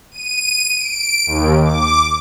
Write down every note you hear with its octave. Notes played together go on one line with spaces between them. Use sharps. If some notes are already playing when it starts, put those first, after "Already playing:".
D#7
D7
D#2
D6